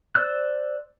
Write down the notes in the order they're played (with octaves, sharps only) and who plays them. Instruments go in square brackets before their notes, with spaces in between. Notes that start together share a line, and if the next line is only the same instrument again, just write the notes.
[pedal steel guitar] C5 D5 E6 F#6